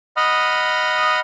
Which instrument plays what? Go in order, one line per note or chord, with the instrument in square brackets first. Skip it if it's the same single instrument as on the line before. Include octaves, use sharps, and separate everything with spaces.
[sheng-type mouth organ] D#5 F#5 B5 D#6 F6